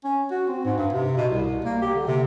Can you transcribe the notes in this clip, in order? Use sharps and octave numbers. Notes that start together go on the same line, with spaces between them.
C#4
F#4
C4
G#2
G2
C3
B2
C2
A#3
G4
D3
C3